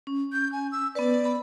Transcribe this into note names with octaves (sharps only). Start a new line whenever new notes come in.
C#4
G6
G#5
E6
B3 B4 D5
B5